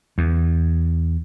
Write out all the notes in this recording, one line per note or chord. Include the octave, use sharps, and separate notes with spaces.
E2